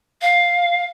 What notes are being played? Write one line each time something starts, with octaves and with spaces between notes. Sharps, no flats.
F5